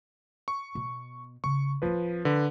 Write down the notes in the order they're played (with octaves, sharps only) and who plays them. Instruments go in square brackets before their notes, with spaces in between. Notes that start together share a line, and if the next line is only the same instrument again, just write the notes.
[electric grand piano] C#6
[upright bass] B2
[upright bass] C#3 [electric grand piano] C#6
[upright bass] D1 C4 [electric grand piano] F3 B4
[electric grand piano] D3 B4